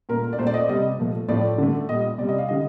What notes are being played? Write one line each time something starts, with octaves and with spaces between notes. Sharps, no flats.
A#2 A3 A#4
D5
A#2 A3 C5
D5
D#5
C3 G3 D#5
A#2 F3 A3
A2 F3 A3 D5
D3 A3
A#2 G3 D#5
C3 G3 D5
D#5
F5
D3 G3 D#5